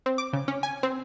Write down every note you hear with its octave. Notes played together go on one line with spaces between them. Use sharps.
C4
D6
C#3
C#4
G#5
C4